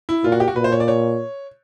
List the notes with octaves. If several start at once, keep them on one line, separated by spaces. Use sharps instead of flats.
E4
A#2 F4
F#4
G4
F#4
A#2 B4
C5
C#5
D5
C#5